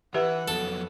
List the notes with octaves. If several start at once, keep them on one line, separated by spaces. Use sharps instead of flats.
E3 G4 B4 E5 F#5
F2 F#3 B3 A4